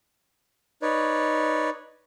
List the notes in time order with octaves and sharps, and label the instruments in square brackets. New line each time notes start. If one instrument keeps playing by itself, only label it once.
[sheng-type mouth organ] D#4 B4 C#5 D5